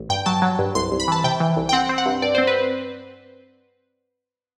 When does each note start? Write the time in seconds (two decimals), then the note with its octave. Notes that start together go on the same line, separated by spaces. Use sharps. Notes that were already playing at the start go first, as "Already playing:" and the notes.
Already playing: A1
0.09 G2 G5
0.26 F#3 A5
0.42 F#3
0.59 G2
0.75 C2 C6
0.92 C2
1.00 B5
1.08 E3 A5
1.24 C3 G5
1.40 E3
1.57 C2
1.69 G5
1.73 C4 F#5
1.89 C4
1.98 F#5
2.06 G2
2.22 G2 D5
2.35 C5
2.38 C4
2.47 B4